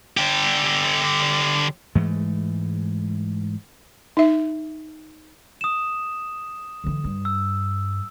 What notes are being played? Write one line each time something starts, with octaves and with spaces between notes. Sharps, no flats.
D3 G4
G#2 E3 G#3 A3
D#4 E5
D#6 E7
D3 E3
G2
E6